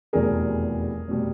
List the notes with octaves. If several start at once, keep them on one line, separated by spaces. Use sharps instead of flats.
F1 E2 B2 G3 G#4 A#4
F1 B2 G3